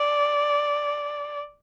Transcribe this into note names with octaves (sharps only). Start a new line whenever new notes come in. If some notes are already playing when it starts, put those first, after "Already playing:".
Already playing: D5